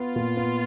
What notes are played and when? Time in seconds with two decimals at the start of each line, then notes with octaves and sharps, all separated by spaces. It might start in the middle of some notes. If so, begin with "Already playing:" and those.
Already playing: B3 F4
0.16 A#2
0.37 B3